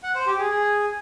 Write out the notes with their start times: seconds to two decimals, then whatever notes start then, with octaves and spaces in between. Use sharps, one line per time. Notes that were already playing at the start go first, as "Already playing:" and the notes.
0.03 F#5
0.15 C5
0.27 G4
0.38 G#4
0.50 G#4